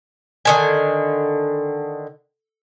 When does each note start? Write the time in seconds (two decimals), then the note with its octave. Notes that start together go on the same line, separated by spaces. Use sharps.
0.45 D3 D#3 G#5